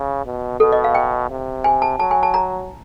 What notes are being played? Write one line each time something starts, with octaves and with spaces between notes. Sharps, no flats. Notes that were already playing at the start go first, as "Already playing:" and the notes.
Already playing: C#3
B2
B2 A4
D#5
F5
G5
C3
G#5
A5
F#3 A5
G#5
A5
A#5